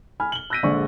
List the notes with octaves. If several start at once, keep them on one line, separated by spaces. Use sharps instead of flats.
G#5 B5 F6
F#7 G7
E6 F#6 G6 A#6 B6 D#7
A#1 D3 G#3 C5 D5 C#6